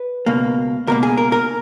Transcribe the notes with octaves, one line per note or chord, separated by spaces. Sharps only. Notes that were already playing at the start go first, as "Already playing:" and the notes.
Already playing: B4
C#2 B2 A#3
C#2 B2 A#3 A#4
G#4
A#4
A#4